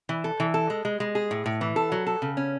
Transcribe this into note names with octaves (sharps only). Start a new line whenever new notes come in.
E3
A4
E3
A4
G#3
G#3
G#3
G#4
A2
A2
E3
A4
F#3
A4
C#3
C#4